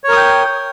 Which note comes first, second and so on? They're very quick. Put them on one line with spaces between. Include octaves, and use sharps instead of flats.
C#5 A#4 D#6 G5